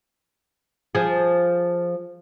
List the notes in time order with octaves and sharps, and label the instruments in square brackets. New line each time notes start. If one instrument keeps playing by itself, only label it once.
[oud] F3 G#4